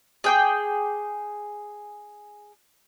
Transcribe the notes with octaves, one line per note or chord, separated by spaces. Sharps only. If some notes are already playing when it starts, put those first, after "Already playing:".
G#4 G5 D6